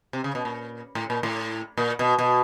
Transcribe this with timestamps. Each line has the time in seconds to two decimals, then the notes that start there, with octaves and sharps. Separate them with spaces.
0.13 C3
0.24 C#3
0.35 B2
0.45 A#2
0.95 A2
1.10 A#2
1.23 A2
1.77 A#2
1.99 B2
2.19 B2